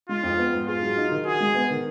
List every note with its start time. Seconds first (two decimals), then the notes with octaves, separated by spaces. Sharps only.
0.09 G#3 F4
0.23 F2
0.38 B3
0.53 G#2
0.67 F4 G#4
0.82 F#3
0.97 D#4
1.11 D#3
1.26 F#4 G#4
1.40 G#3
1.55 B3
1.70 D#3